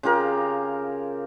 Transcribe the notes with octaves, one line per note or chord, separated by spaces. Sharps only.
C#3 F4 G4 A#4